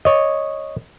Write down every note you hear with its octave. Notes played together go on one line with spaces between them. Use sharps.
C#5 D#5